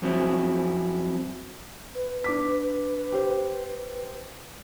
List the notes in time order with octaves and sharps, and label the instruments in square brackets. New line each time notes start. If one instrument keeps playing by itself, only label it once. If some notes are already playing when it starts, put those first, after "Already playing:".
[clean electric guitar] F2 F#3 C4 C#4 E4
[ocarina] B4
[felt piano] D4 D6 B6
G4 C5